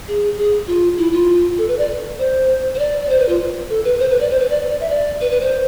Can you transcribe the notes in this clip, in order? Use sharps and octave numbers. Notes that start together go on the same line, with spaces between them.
G#4
G#4
F4
E4
F4
A4
B4
D5
C5
C5
D5
D5
C5
B4
F4
A4
B4
C5
B4
D5
C5
B4
D5
D5
E5
D5
B4
B4
C5